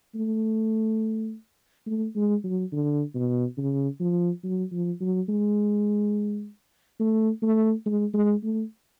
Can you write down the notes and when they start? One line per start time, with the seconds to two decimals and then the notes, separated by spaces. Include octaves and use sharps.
0.15 A3
1.87 A3
2.15 G#3
2.44 F#3
2.72 D3
3.15 B2
3.58 C#3
4.00 F3
4.44 F#3
4.72 F3
5.01 F#3
5.29 G#3
7.00 A3
7.43 A3
7.86 G#3
8.14 G#3
8.43 A3